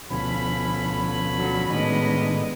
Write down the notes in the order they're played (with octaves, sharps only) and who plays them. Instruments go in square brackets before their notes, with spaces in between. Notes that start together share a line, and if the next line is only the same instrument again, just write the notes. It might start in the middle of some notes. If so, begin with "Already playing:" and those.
[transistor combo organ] D2 B2 F3 [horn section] C#4 A4 B5
[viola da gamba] D3 F#3
[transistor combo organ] A2 D#3 D4 [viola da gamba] G#3 B3 D#5